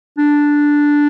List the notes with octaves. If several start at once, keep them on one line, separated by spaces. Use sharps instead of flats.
D4